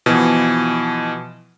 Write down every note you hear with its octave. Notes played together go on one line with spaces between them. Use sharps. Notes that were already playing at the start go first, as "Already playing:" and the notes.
B2 E3 F3